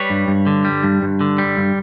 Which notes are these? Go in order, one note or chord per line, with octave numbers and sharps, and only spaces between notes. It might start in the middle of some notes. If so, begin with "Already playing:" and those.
Already playing: G3 B4 C#5
G2
G2
D3
G3
G2
G2
D3
G3
G2